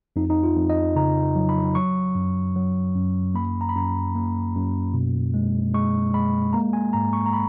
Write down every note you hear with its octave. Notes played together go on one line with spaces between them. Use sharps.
F2 D#4
D#4
F4
F2
D#5
C#3 A#5
F#3
B5
F#3 C#6
F#2
F#3
F#2
A#3 B5
A#5
B5
F#2 A#5
A#3
F#2
B2
G#3
G#3 C#6
G#3 B5
A#3 A#5
G#5
G#2 A#5
C#6
A#5
B5